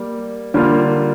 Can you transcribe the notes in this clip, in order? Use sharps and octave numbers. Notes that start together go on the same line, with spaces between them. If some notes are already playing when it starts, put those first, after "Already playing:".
Already playing: G3 A#3
D3 G3 A#3 F4